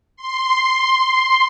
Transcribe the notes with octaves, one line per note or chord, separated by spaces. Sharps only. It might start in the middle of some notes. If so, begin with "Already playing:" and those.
C6